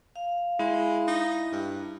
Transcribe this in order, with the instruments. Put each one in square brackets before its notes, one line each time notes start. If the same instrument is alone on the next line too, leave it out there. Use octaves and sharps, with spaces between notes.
[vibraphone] F5
[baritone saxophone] G#3 [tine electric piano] E4
[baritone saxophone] D#4
G2